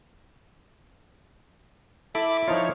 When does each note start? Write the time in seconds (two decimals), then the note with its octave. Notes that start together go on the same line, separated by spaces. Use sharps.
2.15 E4 A4 B5 D6
2.48 F3 D#4 F4 C#5